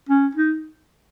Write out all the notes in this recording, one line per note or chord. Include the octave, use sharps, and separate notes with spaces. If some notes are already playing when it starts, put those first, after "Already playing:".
C#4
D#4